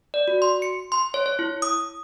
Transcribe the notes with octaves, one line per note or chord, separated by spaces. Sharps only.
D5
F#4
C6
C#7
C6
C#5
C#5
E4
D#6